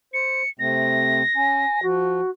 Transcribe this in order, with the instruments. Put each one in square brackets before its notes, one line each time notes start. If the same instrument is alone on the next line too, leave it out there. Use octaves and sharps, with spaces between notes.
[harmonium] C5 [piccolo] C#7
[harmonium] C3 A3 C4 [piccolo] A#6
[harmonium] C#4 [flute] G#5
[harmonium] F3 [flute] F#4